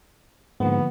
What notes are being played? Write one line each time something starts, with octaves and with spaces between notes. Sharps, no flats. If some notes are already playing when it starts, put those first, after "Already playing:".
G#2 D3 F3 A#3 B3